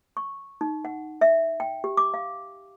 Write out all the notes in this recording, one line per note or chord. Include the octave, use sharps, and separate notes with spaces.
C#6
D#4
F#5
E5
G5
G4
D6
F5